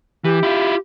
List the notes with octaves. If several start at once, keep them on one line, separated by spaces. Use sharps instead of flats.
E3 G4
E4 F4